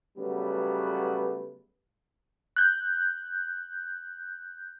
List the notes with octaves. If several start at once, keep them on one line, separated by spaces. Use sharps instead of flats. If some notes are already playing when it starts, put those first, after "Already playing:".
C#3 F#3 G3 A3 B3 B4
F#6 G6